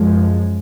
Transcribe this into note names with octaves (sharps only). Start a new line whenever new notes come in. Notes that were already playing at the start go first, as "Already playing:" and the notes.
Already playing: F#2 F3 G#3